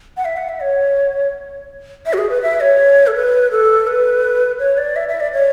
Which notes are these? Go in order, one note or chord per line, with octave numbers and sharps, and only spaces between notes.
F#5
E5
F#5
E5
C#5
E5
F#4
G#4
B4
E5
C#5
A4
B4
A4
B4
C#5
D5
E5
E5
D5
C#5